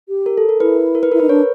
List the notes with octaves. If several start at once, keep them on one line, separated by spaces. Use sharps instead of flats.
G4
A#4
A4
A#4
E4 B4
A#4
B4
E4 A#4
D#4 B4
D4 C#5